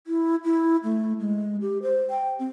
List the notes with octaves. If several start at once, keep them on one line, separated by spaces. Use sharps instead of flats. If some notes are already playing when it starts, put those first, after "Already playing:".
E4
E4
A3
G#3
G4
C5
G5
C4